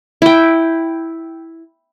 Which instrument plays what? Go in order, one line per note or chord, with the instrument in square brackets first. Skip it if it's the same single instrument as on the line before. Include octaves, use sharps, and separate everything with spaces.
[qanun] E4 G5